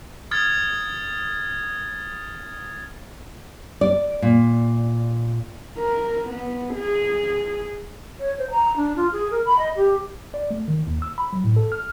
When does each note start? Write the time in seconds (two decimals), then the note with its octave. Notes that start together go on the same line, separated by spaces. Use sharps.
0.31 D#6 F6 G#6 A6
3.81 D5
4.22 A#2
5.78 A#4
6.28 B3
6.74 G#4
8.19 C#5
8.38 C5
8.50 A#5
8.76 D4
8.96 F4
9.12 G#4
9.31 A#4
9.45 B5
9.58 D#5
9.75 G4
10.34 D5
10.51 A3
10.68 D#3
10.87 D#2
11.02 E6
11.18 B5
11.33 F#3
11.44 A2
11.56 A4
11.72 F6